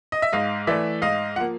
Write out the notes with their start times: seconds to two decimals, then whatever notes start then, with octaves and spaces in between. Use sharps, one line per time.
0.12 D#5
0.22 E5
0.33 G#2 D#5 F5
0.67 E3 A3 D5 E5
1.02 G#2 D#5 F5
1.36 F3 A#3 F#5